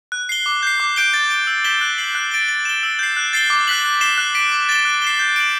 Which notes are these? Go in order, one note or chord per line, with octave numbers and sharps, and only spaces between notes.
F#6
C7 G7
D6
G6 C7
D6
G6 D7 G7
A6
D7 G7
E6
G6 B6 E7 G7
F#6
C7 F#7
F#6
A6 D7 G7
A6
E7 G7
E6
G6 C7
F#6
A6 C7 G7
D6
F#6 B6 F#7
F#6
C7 E7 G7
F#6
B6 D7
D6
A6 E7 G7
F#6
C7 E7 G7
G6
D7 F#7